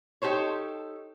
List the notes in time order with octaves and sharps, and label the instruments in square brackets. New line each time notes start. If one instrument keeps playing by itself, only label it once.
[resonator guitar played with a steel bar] D#4 G4 A4 C5 C#5